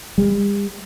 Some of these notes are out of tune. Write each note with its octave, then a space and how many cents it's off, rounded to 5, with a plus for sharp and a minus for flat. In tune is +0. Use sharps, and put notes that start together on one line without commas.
G3 +45